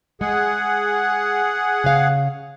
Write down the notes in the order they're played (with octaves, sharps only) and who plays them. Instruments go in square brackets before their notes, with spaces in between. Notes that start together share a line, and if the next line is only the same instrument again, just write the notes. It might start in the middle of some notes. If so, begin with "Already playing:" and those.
[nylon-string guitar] G#3 [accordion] G#4 F#5
[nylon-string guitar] C#3 F5